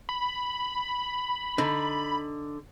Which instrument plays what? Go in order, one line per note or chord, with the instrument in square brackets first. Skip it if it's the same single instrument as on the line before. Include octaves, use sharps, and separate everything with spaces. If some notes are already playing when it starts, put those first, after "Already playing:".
[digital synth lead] B5
[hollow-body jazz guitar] D3 D#4